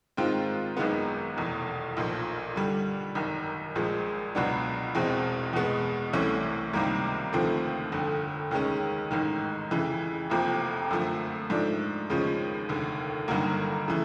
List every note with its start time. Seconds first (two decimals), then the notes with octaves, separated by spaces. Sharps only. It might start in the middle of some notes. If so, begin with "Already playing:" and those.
0.17 G#2 D#3 G#3 C4 F4
0.77 G#1 F#2 D#3 G#3 B3
1.37 F1 E2 B2
1.97 B1 A#2 F3
2.56 G2 D3 G3
3.15 G#1 F#2 D#3
3.75 A#1 A#2 F3 G#3
4.35 C#2 B2 F#3 B3 D4
4.95 E1 E2 B2 G#3 C4
5.53 E2 B2 G#3 B3
6.13 C2 C3 E3 A3 C#4
6.73 C#2 C3 D#3 G3 A#3
7.33 D#2 D3 F3 A3 C4
7.92 G1 F2 D3
8.51 D#2 D#3 G#3 C#4
9.11 A1 G#2 D#3
9.71 F2 C#3 E3
10.30 F1 F2 C3 F3 A#3
10.91 F#2 D3 F3 A3
11.50 G#2 F3 A3 D4
12.10 D#2 C#3 F3 G#3 C#4
12.69 F1 D#2 D3
13.28 G1 G2 D#3 F#3 A#3
13.88 C#3 E3 A3